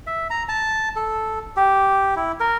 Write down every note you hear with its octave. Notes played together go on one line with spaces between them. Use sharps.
E5
A#5
A5
A4
G4
E4
A#4